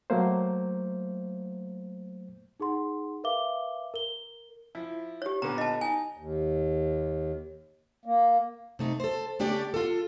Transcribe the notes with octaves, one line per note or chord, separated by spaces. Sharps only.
F#3 A3 A#3 C5
D#4 G#4 F#5 C6
A#4 B4 E5 F5 D6 G7
A#4 G7
F3 E4
G4 C#5
A#2 D3 B3 A#5
D#5 A5
D#4 G#5
D#2
A#3
C3 A3 D#4
A4 C5
C#3 A3 D4 G4 D5
F4 A4